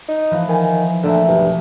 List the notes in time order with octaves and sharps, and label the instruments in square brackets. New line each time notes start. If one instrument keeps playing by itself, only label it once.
[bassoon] D#4
[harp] E3 F3 A3
[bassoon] D#3 [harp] G#5
[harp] A#1 A3 E5 [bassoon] D3
[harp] B1 [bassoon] G2